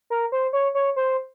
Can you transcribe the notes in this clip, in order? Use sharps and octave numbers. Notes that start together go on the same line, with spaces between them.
A#4
C5
C#5
C#5
C5